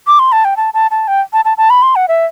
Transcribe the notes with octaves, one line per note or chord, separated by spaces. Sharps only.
D6
C6
A5
G5
A5
A5
A5
G5
A5
A5
A5
B5
C6
F#5
E5